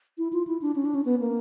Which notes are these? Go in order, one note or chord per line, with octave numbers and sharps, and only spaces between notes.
E4
F4
E4
D4
C#4
D4
C#4
B3
A#3